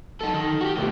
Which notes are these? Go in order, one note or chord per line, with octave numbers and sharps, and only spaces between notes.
D#4 A4
D#3
F#4 G4
B2 A3